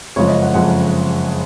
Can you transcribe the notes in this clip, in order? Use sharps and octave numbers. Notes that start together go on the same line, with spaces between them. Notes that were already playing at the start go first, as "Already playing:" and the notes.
F#1 F2 C#3 F3 G#3 C#5
D#5
F#5
F#1 F2 C#3 F3 G#3 F#5